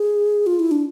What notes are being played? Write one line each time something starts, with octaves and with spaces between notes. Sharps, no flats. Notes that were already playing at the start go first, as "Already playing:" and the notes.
Already playing: G#4
F4
E4
D4